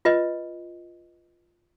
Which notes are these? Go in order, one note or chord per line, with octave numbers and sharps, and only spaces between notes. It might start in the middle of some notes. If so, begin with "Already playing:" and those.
F4 B4 D#5